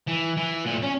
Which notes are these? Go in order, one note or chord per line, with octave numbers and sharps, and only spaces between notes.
E3
E3
A#2 A3
C#4